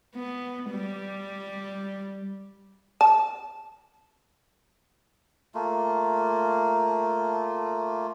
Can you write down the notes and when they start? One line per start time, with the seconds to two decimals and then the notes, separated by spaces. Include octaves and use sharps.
0.16 B3
0.71 G3
3.01 A5
5.54 A3 A#3 F4